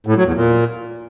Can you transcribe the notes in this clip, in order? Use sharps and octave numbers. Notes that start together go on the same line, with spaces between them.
A2
F#3
E2
A#2